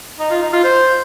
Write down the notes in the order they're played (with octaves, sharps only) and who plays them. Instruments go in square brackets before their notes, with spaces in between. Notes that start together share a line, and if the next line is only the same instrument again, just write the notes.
[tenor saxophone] D#4
F4
D#4
F4
C5